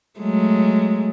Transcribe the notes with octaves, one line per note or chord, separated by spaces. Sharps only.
F#3 G#3 A3